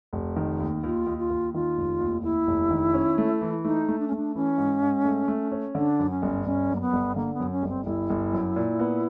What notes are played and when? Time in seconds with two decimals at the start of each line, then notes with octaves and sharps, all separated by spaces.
0.13 F1
0.36 D#3
0.60 D#2
0.83 D#2 F4
1.06 D#2
1.18 F4
1.30 D#2
1.54 D#3 F4
1.77 F1
2.00 D#2
2.23 D#2 E4
2.47 F1
2.71 D#3
2.94 C#4
3.18 A3
3.41 E3
3.65 A3 D#4
3.88 A3
3.99 D4
4.08 C#4
4.12 A3 D4
4.35 E3 C#4
4.58 G#2
4.82 G#2
5.05 A3
5.28 A3
5.52 C#4
5.75 D3 D4
5.99 F#2
6.10 C#4
6.22 G1
6.45 G1 C#4
6.70 F#2
6.76 A#3
6.81 B3
6.93 G1
7.16 D3 A#3
7.34 B3
7.40 F#2
7.51 C#4
7.62 G1
7.69 C4
7.86 G1 E4
8.10 G1
8.33 F#2
8.56 A#2
8.79 B3